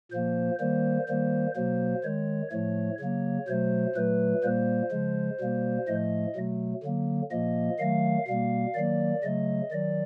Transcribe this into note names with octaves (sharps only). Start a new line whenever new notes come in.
A#2 F3 A#3 C5
D#3 G3 A#3 C5
D#3 G3 A#3 C5
B2 F#3 A#3 C5
D#3 G#3 C#5
A2 F3 A3 C#5
C#3 F#3 A#3 C#5
B2 F#3 A3 C5
A#2 F#3 A3 B4
A#2 G3 A#3 C5
C#3 F3 G#3
B2 G3 A#3
A2 F3 A3 D#5
B2 F#3 A3
D3 F#3 A#3
A#2 F3 A#3 D#5
D#3 F#3 A3 F5
B2 G3 A#3 F5
D#3 F#3 A#3 D5
C#3 F#3 A3 D#5
D#3 F#3 D5